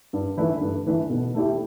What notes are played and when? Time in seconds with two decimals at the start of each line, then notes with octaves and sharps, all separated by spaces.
0.13 G2
0.37 E3 A3 E4 B4
0.61 G2
0.86 E3 A3 E4 B4
1.10 B2
1.34 A3 E4 G4